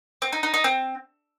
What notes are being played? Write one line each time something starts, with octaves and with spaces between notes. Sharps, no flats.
C4
D#4
D#4
D#4
C4